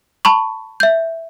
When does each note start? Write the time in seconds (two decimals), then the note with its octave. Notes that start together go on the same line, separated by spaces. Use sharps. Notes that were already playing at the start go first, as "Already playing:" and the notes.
0.25 A5 B5 C#6
0.80 E5 G6